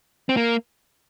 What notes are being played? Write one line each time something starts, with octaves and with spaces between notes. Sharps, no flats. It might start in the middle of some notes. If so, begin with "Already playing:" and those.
C4
A#3